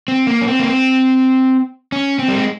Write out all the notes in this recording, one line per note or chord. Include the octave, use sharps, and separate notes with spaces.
C4
A#3
C#4
C4
A#3
C4
C#4
C4
G3
G#3